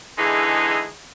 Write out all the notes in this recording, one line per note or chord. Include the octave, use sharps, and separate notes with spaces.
D3 E3 G#3 D#4 E4 G#4